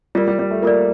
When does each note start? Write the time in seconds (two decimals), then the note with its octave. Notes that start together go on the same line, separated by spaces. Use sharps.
0.15 G3 F4 A#4 D5
0.28 G3
0.39 G3
0.51 A3
0.62 A#3 F4 A#4 D5